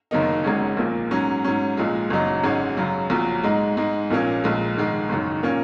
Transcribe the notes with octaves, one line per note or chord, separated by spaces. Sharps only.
F#1 F#2 D#3 A#3 D#4
G#1 G#2 G#3 C#4
A#1 A#2 A#3
G#2 F#3 C#4
G#2 F#3 C#4
A#1 A#2 G#3
F#1 F#2 F#3 D#4
G#1 G#2 G#3 C#4
F#2 C#3 F#3
A#1 A#2 F#3
G#2 G#3 D#4
G#2 G#3 D#4
A#1 A#2 A#3 C#4
A#1 A#2 G#3
A#1 G#2 D#3 G#3
F#1 F#2 D#3
A#2 A#3 C#4